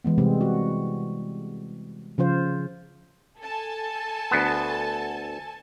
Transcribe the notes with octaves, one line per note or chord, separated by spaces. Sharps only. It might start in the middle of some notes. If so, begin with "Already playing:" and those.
E3 G#3 B3
C3 G3 G#3 C4
F#4
C#3 F3 F4 C5
A4 G#5 A5
D2 B3